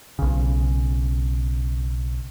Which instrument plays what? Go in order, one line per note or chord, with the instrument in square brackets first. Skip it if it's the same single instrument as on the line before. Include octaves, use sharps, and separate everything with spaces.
[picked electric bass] B1 C#3